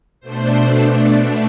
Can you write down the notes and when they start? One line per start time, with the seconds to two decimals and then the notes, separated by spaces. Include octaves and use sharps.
0.21 B2 A3 D4 C5